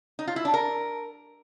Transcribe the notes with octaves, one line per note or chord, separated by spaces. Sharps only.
D#4
F4
E4
D4
A#4